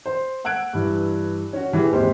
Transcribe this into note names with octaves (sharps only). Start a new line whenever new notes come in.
C5
F#5 E6 F#6 G#6 D7
G2 E3
C#4 F#4
E3 G4 G#4
G#1 D#2 G#3 G4 C5